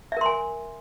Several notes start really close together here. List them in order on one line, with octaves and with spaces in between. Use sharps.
E5 A#4 C6 G#5